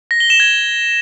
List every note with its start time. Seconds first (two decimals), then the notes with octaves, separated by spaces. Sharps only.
0.11 A#6
0.20 G7
0.30 E7
0.40 G#6